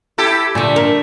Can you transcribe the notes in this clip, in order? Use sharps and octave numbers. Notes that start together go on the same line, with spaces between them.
E4 G4 A4
A#2 D3 A3
A#4